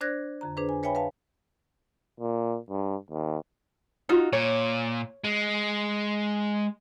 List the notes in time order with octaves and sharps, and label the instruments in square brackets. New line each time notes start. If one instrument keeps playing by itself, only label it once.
[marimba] D4 C5 D5 F#6 G#6 A#6
F2 D3 A#5
D4 G#4 B4 C5
G#5
B4 C#5 E5 G5 G#5 B5
B4 F5 A5
[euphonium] A#2
G2
D#2
[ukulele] D#4 F4 F#4
[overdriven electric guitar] A#2 [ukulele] C#5
[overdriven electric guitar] G#3